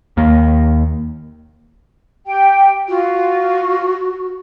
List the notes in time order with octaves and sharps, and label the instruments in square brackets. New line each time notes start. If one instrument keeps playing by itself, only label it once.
[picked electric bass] D#2 A#3
[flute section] G4 G5
[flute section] F4 [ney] F#4